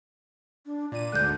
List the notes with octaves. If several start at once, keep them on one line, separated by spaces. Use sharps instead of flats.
D4
A#2 D5 D#7
D2 G#2 D3 F#6 G6